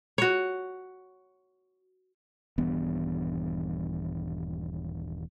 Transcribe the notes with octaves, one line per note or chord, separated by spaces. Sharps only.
F#4 C#5
D#1 G2 E3 B3